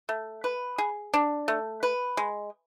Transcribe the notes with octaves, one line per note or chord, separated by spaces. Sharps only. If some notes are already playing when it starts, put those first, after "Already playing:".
A3
B4
G#4
D4
A3
B4
G#3